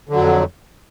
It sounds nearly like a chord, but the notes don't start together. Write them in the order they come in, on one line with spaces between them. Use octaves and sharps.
D3 F#3 F2